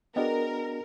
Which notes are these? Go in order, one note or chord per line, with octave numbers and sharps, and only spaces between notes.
B3 D4 F#4 G#4 A#4 D#5 G5